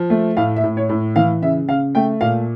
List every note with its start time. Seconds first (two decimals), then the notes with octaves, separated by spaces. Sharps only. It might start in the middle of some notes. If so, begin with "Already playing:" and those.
Already playing: F3
0.10 A3
0.37 A2 F5
0.56 E5
0.64 A2
0.77 C#5
0.89 A2
1.16 E3 F5
1.42 C#3 E5
1.68 C#3 F5
1.95 A3 G5
2.21 A#2 F5